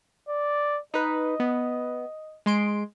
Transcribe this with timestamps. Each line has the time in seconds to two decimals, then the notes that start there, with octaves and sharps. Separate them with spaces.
0.29 D5
0.94 D#4 B4 D#5
1.40 B3
2.46 G#3 C6 D7